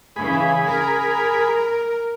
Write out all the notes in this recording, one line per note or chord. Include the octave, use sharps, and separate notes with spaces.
C#3 E3 G#4 B5
A#4